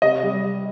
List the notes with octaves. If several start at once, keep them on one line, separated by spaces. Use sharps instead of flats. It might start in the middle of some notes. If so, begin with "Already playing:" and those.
C3 D#5
G3